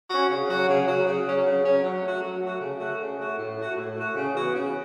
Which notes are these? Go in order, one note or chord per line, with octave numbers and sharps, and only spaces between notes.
C#4 F#4
C#3
F#3 C#4 F#4
C#3
F#3 C#4 F#4
C#3
F#3 C#4
C#3
F#3 C#4
F#3
A3 F#4
F#3
A3 F#4
C#3
A3 F#4
C#3
A3 F#4
A2
A3 F#4
A2
A3 F#4
C#3
E3 B3 F#4
C#3